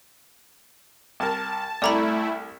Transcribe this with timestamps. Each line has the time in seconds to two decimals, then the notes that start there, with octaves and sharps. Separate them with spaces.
1.20 C2 A#4 A5
1.82 C2 A3 E4 D5 A#5 B5 D6